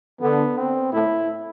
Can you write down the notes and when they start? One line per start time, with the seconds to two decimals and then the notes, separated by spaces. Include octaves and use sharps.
0.21 D3 B3
0.57 C4
0.92 A2 E4